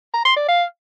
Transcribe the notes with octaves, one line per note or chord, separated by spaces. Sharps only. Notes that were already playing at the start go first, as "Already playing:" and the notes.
A#5
C6
D5
F5